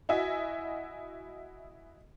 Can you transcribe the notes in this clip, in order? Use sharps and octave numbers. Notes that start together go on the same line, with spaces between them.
E4 F#4 D#5 E5 G#5